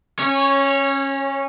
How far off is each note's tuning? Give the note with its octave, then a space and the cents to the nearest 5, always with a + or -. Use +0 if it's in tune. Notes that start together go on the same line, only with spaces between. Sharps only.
C#4 -20 C#5 +0